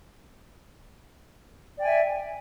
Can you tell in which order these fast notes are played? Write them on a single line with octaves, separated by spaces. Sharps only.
D5 G5 G#5 E5